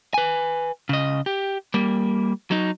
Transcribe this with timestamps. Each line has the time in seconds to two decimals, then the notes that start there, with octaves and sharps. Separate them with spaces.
0.14 B4 G#5
0.89 C#3 D#5
1.26 G4
1.74 G3 A#3
2.51 F#3 D#4